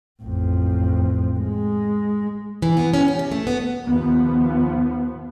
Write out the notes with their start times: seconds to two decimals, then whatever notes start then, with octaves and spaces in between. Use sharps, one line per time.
0.22 A1 F2
1.39 G#3
2.62 E3
2.77 B3
2.94 C#4
3.08 G4
3.19 C3
3.31 A3
3.47 B3
3.86 D#2 F3 B3